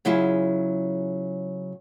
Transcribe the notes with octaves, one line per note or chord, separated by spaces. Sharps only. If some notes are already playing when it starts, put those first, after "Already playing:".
C#3 F#3 E4 F4 G#4